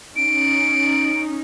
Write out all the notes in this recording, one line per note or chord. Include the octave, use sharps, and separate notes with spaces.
C#4 D#4 D7